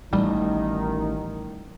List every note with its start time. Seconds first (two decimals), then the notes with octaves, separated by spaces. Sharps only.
0.13 A1 D#3 G3 D#4